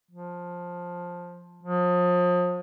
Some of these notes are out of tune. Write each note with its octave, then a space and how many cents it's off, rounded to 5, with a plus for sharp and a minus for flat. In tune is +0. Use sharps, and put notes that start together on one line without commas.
F3 +10
F3 +35